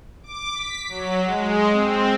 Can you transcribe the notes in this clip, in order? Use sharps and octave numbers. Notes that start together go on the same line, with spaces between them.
D6
B6
F#3
G#3
C4